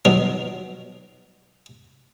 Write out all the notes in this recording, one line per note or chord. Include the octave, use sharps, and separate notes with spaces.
B2 D#3 F3 F#3 A#4